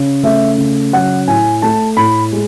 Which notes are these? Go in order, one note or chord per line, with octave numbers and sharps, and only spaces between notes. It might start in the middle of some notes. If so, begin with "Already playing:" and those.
Already playing: C#3
A3 E5
C#3
F#3 F#5
A2 G#5
A3 A5
A2 B5
G#3